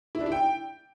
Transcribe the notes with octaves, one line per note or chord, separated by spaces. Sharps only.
E4
D4
E4
G5